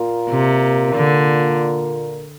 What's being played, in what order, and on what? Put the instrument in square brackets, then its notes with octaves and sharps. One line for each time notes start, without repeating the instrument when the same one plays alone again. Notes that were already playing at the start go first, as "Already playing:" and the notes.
Already playing: [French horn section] A#2 A#3 F4 A#4
[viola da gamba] C3
D3